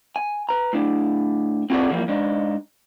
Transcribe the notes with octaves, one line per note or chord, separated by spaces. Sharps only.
G#5
B4 A#5
A2 D4
C4 F4 F#4 G#4 A4 D5
D3 E3 F3 G3 A#3
G#2 D4 D#4